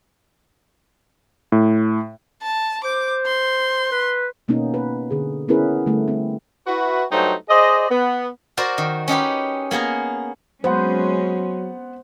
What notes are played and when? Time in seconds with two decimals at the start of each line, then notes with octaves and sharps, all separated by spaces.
1.52 A2
2.42 A5
2.84 C5 D6
3.26 C6
3.92 B4
4.48 B2 A#3 B3 C#4 D#4
4.74 B4
5.11 D3 G#4
5.48 B3 C#4 E4 G#4 A#4 B4
5.86 D3 G3 A3
6.08 C4
6.67 E4 F#4 B4
7.10 G2 F#3 A3 D#4 C5 G5
7.50 G#4 C5 D5 D#5
7.90 B3
8.57 F#4 A#4 C5 D5
8.78 D#3
9.08 C#4 D#4 G4 B4
9.71 A#3 B3 G#4 A#4
10.64 F#3 G#3 B3 C#4 C5 F#5